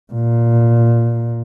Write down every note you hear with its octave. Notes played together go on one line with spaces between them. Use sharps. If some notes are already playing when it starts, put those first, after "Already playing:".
A#2